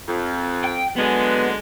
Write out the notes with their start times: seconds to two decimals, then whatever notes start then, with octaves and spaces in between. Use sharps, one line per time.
0.07 F2
0.64 G5
0.97 D3 F#3 G#3 B3